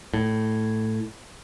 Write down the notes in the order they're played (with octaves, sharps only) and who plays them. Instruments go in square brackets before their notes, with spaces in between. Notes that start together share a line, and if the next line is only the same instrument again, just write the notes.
[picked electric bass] A2